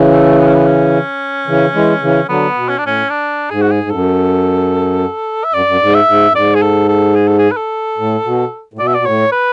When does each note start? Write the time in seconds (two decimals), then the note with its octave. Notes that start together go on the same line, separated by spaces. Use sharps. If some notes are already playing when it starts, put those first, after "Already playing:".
Already playing: C#3 E3
0.12 A3
0.40 B3
0.47 C#4
0.55 B3
0.66 C#4
1.47 C#3 E3
1.74 E3 G#3
2.01 C#3 E3
2.28 D3 F#3 B3
2.56 B2
2.69 C#4
2.78 D4
2.83 A2 C#4
3.10 D4
3.50 G#2 G#4
3.62 F#4
3.72 G#4
3.83 G#2
3.91 F#2 A4
5.44 E5
5.54 F#2 D5
5.68 F#2
5.81 G#2
5.94 E5
6.08 G#2
6.30 F#2
6.34 G#2 D5
6.55 G#4
6.62 A4
6.88 A4
7.16 G#4
7.28 A4
7.39 G#4
7.52 B4
7.57 A4
7.98 A2
8.25 B2
8.74 A2
8.79 B2 D5
8.87 E5
8.94 D5
8.99 B2
9.06 A2 C#5
9.32 B4